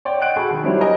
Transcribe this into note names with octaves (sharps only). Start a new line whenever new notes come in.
C#5 D5 G5
D#5 F#5 G5 F#6 D7
F#4 G#4 A4 B5 C#6
D#3
F#3 G3 C4 D4 E4 C#5
A#4 D#5 G#5